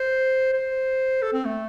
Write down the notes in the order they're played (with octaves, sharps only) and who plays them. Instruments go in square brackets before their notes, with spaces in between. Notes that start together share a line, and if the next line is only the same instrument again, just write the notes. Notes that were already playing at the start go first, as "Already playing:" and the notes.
Already playing: [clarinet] C5
C5
A4
C4
A3